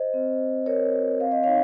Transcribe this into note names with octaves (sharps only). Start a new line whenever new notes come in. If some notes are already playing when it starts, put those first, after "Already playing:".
Already playing: C5 D#5
C4
F#4
C4 A#4 C#5
F#4
C4 F5
D#5
D#4 C#5 F5